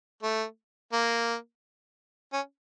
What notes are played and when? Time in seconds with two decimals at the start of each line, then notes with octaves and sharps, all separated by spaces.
0.23 A3
0.93 A#3
2.33 C#4